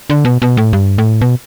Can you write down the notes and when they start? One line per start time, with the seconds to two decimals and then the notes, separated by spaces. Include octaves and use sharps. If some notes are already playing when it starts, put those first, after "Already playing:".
0.10 D3
0.25 B2
0.42 B2
0.57 A2
0.73 G2
0.98 A2
1.21 B2